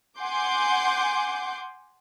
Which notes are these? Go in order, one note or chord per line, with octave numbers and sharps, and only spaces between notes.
F#5 G#5 C6 D6 G6